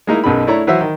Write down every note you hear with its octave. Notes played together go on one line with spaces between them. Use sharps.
G#3 A#3 D#4 E4
B1 F#2 B2 G#4 B5
A3 D4 E4 C#5 A#5
E3 F#3 C5 E5 E6
D#3